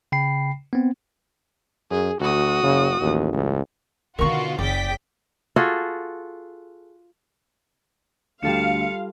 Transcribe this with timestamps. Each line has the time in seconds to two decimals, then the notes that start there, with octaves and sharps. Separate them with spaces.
0.12 C#3 G5 B5 C7
0.73 B3 C4
1.91 F#2 G#4
2.20 D2 F#4 D#6
2.63 F#1 C#3
3.01 A1 D#2
3.33 C#2
4.19 B2 D3 D#3 F4 F#4 A#4 C#6
4.59 F#1 C#3 D5 G5 B6
5.56 F4 F#4 G#4 A4
8.43 D2 G3 F4 A4 F5 C#7 E7